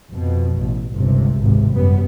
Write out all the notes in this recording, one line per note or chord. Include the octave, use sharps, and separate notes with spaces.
F2 B2
A1
G1 C#2 C3
G#1 C#2 G#2 C3
F#2 G3 B3